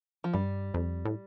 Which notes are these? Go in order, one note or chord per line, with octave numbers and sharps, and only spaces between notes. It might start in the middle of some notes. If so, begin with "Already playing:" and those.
F3
G2 G3
F2
A2